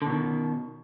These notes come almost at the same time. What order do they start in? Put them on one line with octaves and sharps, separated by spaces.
D3 B2 D#3